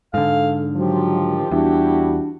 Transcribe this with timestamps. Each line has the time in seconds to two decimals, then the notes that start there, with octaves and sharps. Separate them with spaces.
0.14 G#2 D3 A4 F5
0.75 D#3 F3 F#3 G4
1.51 E2 G3 D4 E4 F#4